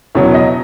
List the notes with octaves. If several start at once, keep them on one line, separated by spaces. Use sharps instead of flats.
E1 E2 C#3 F#3 C#5
D#5